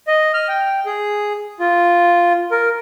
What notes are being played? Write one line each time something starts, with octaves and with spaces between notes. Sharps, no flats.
D#5
F6
G5
G#4
F4
A#4